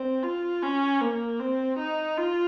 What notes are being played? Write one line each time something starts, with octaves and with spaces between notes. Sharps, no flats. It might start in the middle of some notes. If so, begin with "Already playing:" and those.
Already playing: C4
F4
C#4
A#3
C4
D#4
F4